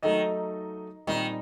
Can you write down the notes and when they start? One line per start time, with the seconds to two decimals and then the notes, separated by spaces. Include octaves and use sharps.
0.03 D#3 F#3 A3 D#4 A4 D#5
1.07 A#2 D#3 G3 C4